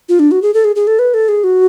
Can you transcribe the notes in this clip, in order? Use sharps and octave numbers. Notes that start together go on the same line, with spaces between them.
F4
D4
F#4
G#4
A4
G#4
G#4
A4
B4
A4
G#4
F#4